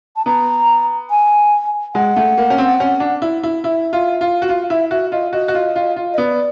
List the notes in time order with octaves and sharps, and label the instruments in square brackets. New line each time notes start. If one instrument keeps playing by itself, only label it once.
[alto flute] A5
[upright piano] B3 [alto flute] A#5
[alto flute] G#5
[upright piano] G#3 [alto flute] F#5
[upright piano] A3
A#3
C#4
C4
C#4
D4
E4
E4
[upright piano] E4 [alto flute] E5
[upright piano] F4
F4
F#4
[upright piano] F4 [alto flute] F5
[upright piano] E4 [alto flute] E5
[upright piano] F#4 [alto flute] E5
[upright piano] F4 [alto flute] D#5
[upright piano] F#4 [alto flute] D#5
[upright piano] F#4
F4
F4
F4
[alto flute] D#5
[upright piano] B3 [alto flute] D5